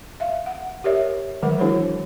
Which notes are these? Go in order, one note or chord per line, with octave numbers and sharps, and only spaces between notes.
E5 F5
F#5
G4 A#4 C#5 D5 E5
D#3 E3 F#3 G#3 A#4 F#5
D4 E4 F#4 G#4 C5 C#5